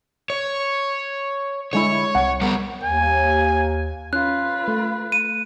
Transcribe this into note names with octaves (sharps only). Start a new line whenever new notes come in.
C#5
D3 G#3 E4 C#5
C2 F#5
G3 B3 A#4
D#2 G#5
C#4 F4 B4 F#6
A3
D#7